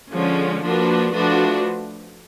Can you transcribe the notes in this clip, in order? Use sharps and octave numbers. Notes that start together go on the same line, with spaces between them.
D3 F3 G#3 C#4
F3 A#3 D4 F#4 B4
F3 A3 D4 F#4 B4